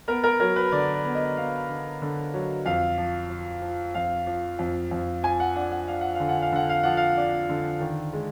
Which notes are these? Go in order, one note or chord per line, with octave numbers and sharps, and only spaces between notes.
B3 A#4
A#4
F#3 A#4
B4
D3 D5
D5
B3
D#5
B3 F5
D3
D3
F#3
F2 F5
F3
F3
F3
F2 F5
F3
F2
F2
F3 G#5
F#5
D4 F#5
F#5
D4 F5
F#5
D3 F5
F#5
F5
D3 F#5
F5
F3 F#5
F5
D4
D3
D#3
G#3